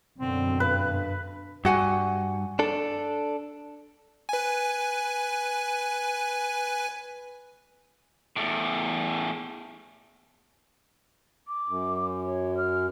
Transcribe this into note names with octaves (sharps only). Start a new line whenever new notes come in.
F#2 B2 D3 C4
G2 B4
G2 F#4 F#5 G#5
D4 A4
B4 G#5
E2 A2
D6
F#2
C#5
F6